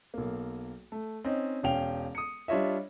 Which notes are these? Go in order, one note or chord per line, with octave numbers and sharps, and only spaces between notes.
B1 A#3
A3
C4 C#4 D#4
E1 C#4 F5 G5 F7
D#6 C#7
G3 D4 F4 C#5 D#5 E5